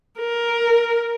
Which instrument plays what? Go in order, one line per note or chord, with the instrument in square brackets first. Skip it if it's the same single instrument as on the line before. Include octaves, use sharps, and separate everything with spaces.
[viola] A#4